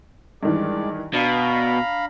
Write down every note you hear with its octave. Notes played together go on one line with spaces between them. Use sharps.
G2 D#3 E3 G#3 D5
B2 D4 F5 A#5 B5